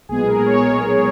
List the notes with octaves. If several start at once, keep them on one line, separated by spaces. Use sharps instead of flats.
B1 A#2 G#3 B3 G#4
A#4
C#5